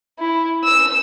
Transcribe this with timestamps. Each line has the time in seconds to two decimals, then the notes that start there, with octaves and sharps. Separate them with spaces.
0.20 E4
0.65 E6